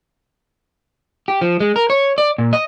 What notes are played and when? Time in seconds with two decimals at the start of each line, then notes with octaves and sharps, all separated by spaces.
1.28 G4
1.41 F3
1.60 G#3
1.76 A#4
1.90 C#5
2.18 D5
2.38 A#2
2.53 D#5